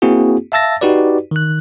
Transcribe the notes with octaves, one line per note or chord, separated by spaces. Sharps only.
A#3 C4 E4 F#4 G#4
E5 F5 A5 E6 A6 A#6
D#4 F#4 G4 B4 D5
D#3 F#6